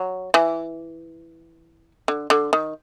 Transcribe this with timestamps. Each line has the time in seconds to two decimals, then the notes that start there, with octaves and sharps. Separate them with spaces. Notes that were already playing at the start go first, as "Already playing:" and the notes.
Already playing: F#3
0.34 E3
2.08 D3
2.30 D3
2.53 D#3